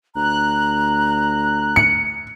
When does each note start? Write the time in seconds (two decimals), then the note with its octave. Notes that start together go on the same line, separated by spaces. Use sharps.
0.15 D2 A#5 F#6
1.76 C#7